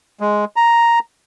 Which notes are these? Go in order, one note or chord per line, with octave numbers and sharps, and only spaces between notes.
G#3
A#5